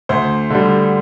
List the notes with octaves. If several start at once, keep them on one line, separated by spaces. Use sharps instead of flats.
D2 C5
D3 G3